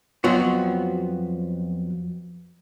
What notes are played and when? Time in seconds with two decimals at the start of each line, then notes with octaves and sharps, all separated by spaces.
0.24 F2 F3 F#3 B3 F#4